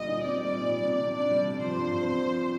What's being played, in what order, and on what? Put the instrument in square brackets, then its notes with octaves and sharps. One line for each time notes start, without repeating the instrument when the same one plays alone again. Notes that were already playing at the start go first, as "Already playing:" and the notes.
Already playing: [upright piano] D2 A#2 G3 [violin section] D#5
[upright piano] D#4
[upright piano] C4 [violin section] D5
[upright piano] G3
A#2
G3
C3
C3
[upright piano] D4 [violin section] D5
[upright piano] G3
C3
[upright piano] F3 [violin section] C5
[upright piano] G2
G2
C4
F3